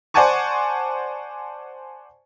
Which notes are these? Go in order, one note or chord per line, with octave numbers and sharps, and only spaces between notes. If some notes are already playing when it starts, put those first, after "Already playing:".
C5 D5 F#5 G#5 A5 C#6